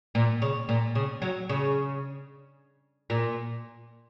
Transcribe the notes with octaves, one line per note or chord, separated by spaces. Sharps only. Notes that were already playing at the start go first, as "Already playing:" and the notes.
A#2
C#3
A#2
C#3
F#3
C#3
A#2